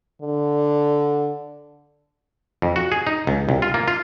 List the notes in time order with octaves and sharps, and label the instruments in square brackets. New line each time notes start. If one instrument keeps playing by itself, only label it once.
[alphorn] D3
[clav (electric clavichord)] F2
F#4
G#4
D#4
C#2
C2
F4
A#3
F4